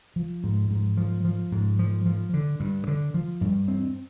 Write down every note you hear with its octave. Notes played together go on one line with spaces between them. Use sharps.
F3
G#2
G#2
F3
F3
G#2
F3
F3
D3
G2
D3
F3
G2
C4